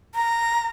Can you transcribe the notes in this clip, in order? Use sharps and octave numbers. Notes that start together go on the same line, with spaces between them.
A#5